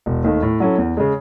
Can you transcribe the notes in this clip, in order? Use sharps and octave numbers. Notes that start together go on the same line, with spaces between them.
E1
D#2 D#3 A3
A2
F#3 C#4 E4 A4
E2
C#3 G#3